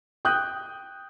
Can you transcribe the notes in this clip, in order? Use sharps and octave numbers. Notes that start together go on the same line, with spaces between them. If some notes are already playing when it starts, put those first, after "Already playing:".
G5 D#6 F#6 G6